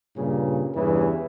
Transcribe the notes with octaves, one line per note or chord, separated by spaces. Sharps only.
G2 A#2 C#3
E2 G2 C#3 E3